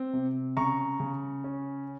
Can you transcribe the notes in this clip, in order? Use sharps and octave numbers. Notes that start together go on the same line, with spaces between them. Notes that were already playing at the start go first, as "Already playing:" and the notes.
Already playing: C4
C3
C#3 A#5 C#6
C#3
C#4